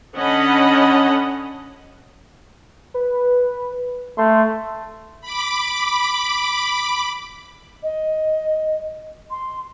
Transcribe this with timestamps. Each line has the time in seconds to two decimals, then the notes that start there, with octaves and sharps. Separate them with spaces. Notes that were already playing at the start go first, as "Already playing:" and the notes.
0.15 D3 C#4 D#5 F#5 A5 B5
2.94 B4
4.18 A3 C6
5.21 B5 D6
7.83 D#5
9.31 C6